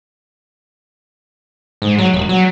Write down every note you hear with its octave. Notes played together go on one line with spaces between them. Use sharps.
G#2
F#3
E1
F#3